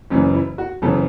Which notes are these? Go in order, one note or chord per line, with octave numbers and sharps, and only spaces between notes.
F#1 F#2 C#3 E3 C#4
E4
F#4
F#1 F#2 C#3 E3 A4